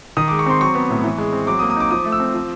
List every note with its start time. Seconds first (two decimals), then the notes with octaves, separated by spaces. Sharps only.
0.17 D#3 D#6
0.28 G#3 D6
0.39 C#6
0.46 C4 C6
0.61 F#3 C#6
0.75 B3
0.90 A2
1.04 E3
1.18 G#3
1.33 C4
1.47 F#3 D6
1.59 D#6
1.62 A#3
1.70 D#6
1.76 D#4 D6
1.91 F3 D#6
2.06 A3
2.12 E6
2.20 C4
2.34 F3